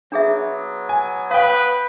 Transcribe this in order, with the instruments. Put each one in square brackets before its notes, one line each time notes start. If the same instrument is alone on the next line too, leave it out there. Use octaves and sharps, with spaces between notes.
[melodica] F#3 B3 [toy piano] D4 G#4 E5
[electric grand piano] G#5
[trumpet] B4 [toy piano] F5 C#6 [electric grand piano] G5 D#6